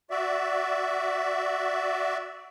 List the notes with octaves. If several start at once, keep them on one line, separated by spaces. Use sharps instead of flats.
F#4 D5 E5